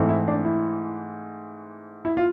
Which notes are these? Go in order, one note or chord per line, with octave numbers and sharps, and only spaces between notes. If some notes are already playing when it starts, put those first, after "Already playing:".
Already playing: G#2 E3 A3 C4
E4
D4
E4
E4
F4